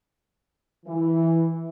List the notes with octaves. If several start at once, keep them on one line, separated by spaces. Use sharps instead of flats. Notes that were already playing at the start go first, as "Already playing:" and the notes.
E3